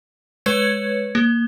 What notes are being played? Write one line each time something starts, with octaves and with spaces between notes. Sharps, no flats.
G#3 B4 C#5 G#6 C#7
A#3